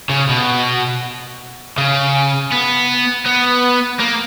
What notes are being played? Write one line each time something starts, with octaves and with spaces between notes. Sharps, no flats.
C#3
B2
C#3
B3
B3
A#3